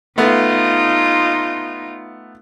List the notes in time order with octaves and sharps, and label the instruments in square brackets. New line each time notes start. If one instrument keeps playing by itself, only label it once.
[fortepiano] A3 B3 [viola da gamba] D#4 F4